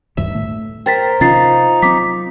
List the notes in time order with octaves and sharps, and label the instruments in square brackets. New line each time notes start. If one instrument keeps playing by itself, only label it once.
[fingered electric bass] D2 G2 D#3 [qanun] E5
[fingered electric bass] A2 A3
[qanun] A#4 C5 [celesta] G5 A6 B6
[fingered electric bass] C3 C#4 [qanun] F3 [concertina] D#4 [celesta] F4 A6 C7
[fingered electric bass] F#3 C4 [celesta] D6 B6